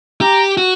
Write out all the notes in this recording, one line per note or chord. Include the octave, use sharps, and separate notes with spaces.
G4 A#5
F#4